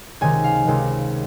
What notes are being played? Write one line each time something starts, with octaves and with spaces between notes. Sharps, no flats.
C#2 C3 D#3 G#5
F5
C#2 C3 D#3